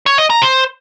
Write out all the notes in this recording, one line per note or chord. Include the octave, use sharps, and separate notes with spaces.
C#5
D#5
A#5
C5